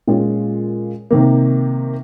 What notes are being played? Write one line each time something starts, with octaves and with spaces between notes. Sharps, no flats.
A#2 G#3 C#4 F4
C3 D#3 A#3